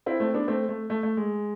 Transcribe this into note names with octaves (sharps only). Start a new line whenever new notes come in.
C4 E4
A3 C4
B3 D4
A3 C4
A3
A3
A3
G#3